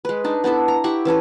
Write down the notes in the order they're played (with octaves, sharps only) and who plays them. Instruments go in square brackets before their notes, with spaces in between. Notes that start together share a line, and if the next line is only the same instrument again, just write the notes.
[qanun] G#3 B4
D4 D#4
B3 D4 E4 A4
A#5
E4 G4 F#5 C#6
E3 C#4 A4 B4